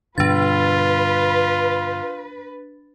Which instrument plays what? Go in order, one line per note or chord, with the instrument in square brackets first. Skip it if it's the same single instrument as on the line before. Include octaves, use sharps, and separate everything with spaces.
[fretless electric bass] G2 B2 D3 [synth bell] D4 A6 [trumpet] F4 [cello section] B4